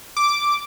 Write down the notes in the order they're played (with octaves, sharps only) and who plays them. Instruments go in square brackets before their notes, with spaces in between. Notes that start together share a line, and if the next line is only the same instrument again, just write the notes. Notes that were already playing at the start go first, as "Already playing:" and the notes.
[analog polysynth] D6